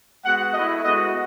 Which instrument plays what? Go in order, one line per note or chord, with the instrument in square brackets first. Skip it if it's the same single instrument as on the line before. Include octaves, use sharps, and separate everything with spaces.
[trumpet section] G#3 B3 F#4 F#5
A3 D#5
E4
G#3 B3 F#4 D#5